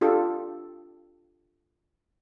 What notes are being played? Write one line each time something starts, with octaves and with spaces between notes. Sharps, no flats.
D4 F4 G4 A4